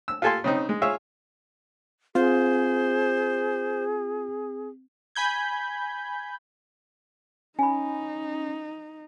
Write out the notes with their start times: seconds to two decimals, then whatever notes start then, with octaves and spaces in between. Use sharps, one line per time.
0.08 E6
0.22 F4 G4 A4 G#5 A5 C6
0.44 C#3 C4 D#4
0.69 G#3
0.82 F4 G#4 C#5 E5
2.15 C4 F4 G#4 C5
5.15 G#5 B5 G6 G#6
7.59 C#4 D#4 G#5 B5